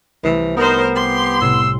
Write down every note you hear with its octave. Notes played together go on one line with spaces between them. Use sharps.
C2 E3 A3 E7
B3 D#4 A#4 C5
G4 C6
A2 C3 E6